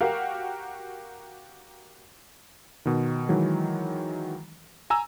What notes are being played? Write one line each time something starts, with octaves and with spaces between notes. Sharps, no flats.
F#4 G4 A#4 F5
B2 D#3
D#3 E3 F#3 G#3
G#5 A#5 E6